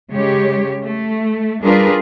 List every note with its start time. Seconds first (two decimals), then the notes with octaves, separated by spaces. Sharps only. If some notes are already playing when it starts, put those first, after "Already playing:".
0.11 C#3 G#3 G4 C#5
0.83 A3
1.63 G3 D4 F4 G#4 A#4 B4